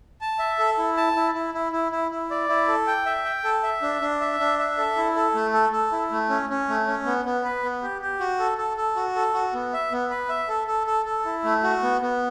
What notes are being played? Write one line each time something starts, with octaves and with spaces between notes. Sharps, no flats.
A5
E5
A4
E4
A5
E4
E4
E4
E4
E4
E4
D5
E4
A4
G5
E5
G5
A4
E5
D4
D4
E5
D4
E5
A4
E4
A4
A3
A4
A4
E4
A3
C#4
C#4
A3
C#4
B3
B3
B4
B3
G4
G4
F#4
A4
A4
A4
F#4
A4
F#4
B3
E5
B3
B4
E5
A4
A4
A4
A4
E4
A3
F#4
B3
B3